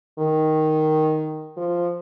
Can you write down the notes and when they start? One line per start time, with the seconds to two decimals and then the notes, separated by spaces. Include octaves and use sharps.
0.19 D#3
1.57 F3